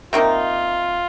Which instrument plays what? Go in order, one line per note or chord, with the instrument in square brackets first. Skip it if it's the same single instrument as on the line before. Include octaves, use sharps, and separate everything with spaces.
[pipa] C3 D#3 A#3 D#4 [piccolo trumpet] F4